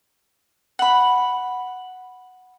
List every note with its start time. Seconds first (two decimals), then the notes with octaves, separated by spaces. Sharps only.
0.79 F#5 B5